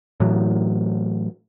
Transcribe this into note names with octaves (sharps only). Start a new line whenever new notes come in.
A2 E3 F#3